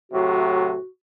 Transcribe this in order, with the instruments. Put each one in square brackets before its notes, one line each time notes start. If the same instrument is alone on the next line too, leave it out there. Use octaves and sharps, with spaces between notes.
[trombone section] A2 C3 F#3 [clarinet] F#4